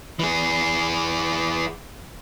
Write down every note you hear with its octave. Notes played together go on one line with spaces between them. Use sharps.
E3 G#4